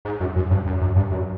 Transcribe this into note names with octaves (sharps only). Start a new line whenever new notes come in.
G#2
F#2
F#2
G2
F#2
F#2
G2
F#2